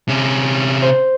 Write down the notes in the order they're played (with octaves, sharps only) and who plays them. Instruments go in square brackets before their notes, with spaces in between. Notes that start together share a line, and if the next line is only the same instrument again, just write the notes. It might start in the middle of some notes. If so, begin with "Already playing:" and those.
[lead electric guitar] C3 C#4
[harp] C5